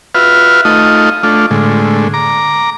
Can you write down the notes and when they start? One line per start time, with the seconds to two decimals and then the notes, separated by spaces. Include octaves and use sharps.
0.15 F4 F#4 B4 E5 F6
0.65 A3 D#4 F4 D#5
1.23 A3 D4 F4
1.51 A2 D3 G#3
2.14 A#5 D6